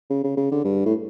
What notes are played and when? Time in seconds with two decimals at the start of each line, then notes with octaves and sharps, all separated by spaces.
0.10 C#3
0.24 C#3
0.37 C#3
0.52 D3
0.64 G2
0.86 A2